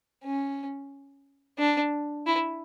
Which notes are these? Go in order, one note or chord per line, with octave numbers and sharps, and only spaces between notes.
C#4
D4
E4